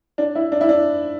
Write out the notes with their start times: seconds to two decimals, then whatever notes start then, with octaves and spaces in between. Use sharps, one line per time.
0.18 D4
0.35 E4
0.52 D4
0.61 E4
0.69 D4